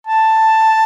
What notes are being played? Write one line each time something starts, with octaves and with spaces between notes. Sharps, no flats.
A5